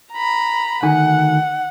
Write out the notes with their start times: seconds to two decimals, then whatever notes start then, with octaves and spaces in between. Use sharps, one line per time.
0.12 A#5 B5
0.83 D2 D#3 F#5 G#5